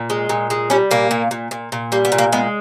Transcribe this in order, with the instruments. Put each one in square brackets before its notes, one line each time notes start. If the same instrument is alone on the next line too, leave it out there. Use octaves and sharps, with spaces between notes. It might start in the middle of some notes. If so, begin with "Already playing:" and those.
Already playing: [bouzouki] A#2
G#3
A#2
G#3
G3 C#4
A#2 A#3
A#2
A#2
A#2
A#2
G3 A#3
B3
A#2
A#3
G#3 B3